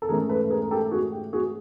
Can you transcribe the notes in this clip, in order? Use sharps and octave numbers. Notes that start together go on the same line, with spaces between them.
A4
G#2 E3 A3 C#4 G#4 A#4
A4 B4
B4
G#4 A#4
A#4
G4 A4
F#4 G#4
G4
F#4 G#4